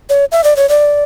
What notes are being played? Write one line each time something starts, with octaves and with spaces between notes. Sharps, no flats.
C#5
E5
D5
C#5
D5